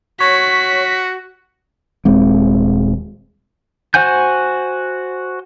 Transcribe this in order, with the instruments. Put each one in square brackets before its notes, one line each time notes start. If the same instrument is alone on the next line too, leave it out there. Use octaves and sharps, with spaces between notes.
[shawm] F#4 [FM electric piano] C#5 [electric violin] B6
[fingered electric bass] D#1 G#3 C4
[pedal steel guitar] F#4 C5 F#5 G#5 G6